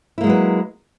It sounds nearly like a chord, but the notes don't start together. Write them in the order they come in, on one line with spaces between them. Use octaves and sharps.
E4 A#3 G#3 F#3 B4